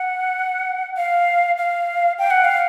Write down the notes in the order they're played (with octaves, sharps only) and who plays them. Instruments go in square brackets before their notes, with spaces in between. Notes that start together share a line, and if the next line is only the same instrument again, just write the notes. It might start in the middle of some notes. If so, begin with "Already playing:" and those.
Already playing: [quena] F#5
F5
F5
G5
F#5
F5